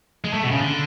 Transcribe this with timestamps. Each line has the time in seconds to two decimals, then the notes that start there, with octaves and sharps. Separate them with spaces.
0.24 G#3
0.33 A3
0.44 B2
0.51 C#3
0.60 D3